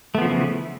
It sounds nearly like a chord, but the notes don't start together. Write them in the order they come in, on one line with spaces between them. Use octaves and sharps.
A3 B3 F3 C#3 E3